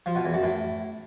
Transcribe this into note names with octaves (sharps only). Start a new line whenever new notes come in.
F3
B2
E2
F#2
A2